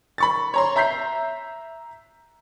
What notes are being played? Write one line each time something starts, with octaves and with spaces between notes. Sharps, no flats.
B5 C#6 A6
C#5 A#5 C6
E5 A#5 G6 B6 C7